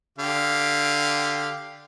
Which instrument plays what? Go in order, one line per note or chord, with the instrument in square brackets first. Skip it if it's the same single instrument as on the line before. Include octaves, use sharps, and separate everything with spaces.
[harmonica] D3 G4 F5